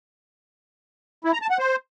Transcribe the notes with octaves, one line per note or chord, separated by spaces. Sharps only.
E4
A#5
A5
F#5
C5